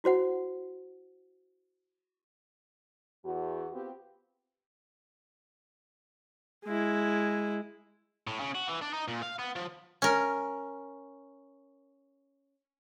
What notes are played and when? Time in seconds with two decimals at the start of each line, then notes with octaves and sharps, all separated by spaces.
0.04 E4 F#4 C5 F#5
3.25 E2 F#4
3.73 B3 C4 F4 G4
6.65 G#3 E4
8.27 A2
8.40 C#3
8.55 F#4
8.68 E3
8.81 D4
8.93 D#4
9.08 A#2
9.23 F5
9.39 B3
9.56 F3
10.02 C#4 A#4